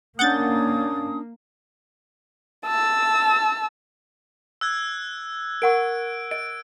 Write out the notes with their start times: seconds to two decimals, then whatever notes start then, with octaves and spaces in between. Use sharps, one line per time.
0.19 A#3 C#4 D4 F#5 D#6 G6 A6
2.66 A5 E6
4.61 E6 F#6 G#6
5.62 A#4 F#5 C#6 D7
6.31 D#5 D7